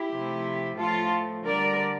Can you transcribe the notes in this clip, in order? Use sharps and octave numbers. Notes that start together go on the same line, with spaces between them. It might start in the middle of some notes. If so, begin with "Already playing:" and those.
Already playing: E4 G4
C3 F3 A3
A2 F3 A3 F4 A4
D3 G3 A#4 D5